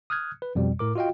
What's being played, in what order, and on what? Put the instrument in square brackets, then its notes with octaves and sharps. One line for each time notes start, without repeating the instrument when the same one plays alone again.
[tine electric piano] D#6 F6 F#6 G#6
B4
F2 B2 G3
A2 A#4 D6
F4 F#4 D#5 F5 G5